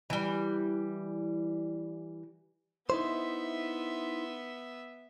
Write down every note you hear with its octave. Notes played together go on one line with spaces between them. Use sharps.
E3 G3
B3 D#4 E4 C5 E5